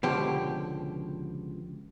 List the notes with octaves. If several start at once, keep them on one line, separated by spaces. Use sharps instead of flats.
C#2 B2 D3 F3 G4